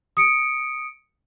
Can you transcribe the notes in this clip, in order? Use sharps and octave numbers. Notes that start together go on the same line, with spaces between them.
D#6 C#7 D7